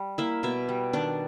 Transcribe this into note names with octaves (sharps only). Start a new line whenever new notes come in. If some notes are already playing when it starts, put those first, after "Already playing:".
Already playing: G3
A#3 E4 E5
B2 E4 E5
G3
D#3 D4 D5